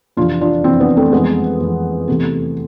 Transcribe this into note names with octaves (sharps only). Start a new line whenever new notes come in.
F2 C3 E3 D4 F4
D4 F4
F2 C3 E3 C4 E4
B3 D4
A3 C4
F2 E3 G#3 B3
F2 E3
E2 C3 E3 A3